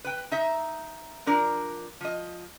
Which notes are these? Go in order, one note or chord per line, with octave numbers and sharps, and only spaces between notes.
B4 G5
D#4 E5
F3 D4 A#4
F3 D#5